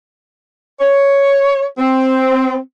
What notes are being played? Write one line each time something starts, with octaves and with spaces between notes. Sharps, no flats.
C#5
C4